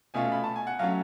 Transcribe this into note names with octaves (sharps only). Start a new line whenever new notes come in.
B2 A3 C#4 F4 G#5
B5
A5
G#5
F#5
F#3 A3 C#4 F5